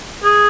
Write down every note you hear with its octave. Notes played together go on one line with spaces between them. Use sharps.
G#4